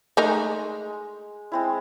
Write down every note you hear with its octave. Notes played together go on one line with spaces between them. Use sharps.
G#3 A3 D#4 A#4
G#3 C4 E4